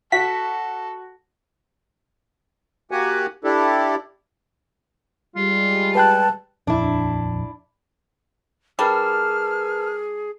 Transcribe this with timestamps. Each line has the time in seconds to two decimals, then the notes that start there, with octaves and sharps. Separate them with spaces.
0.12 F#4 A4 B6
2.91 A#3 F#4 G4 F#5 G#5
3.44 D4 E4 G4 A4
5.36 G3 G#3 F4
5.95 B4 G5 A5 F#6
6.67 D#1 A#1 F2 D4 E4
8.79 G3 D4 G#4 A#4 B4 A5 F6